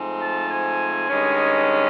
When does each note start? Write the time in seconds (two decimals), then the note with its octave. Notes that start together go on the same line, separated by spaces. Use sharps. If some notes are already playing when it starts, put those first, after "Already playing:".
Already playing: G#2 F3 A3 C4
0.21 A5
0.50 G#5
1.09 G2 D#3 G#3 C#4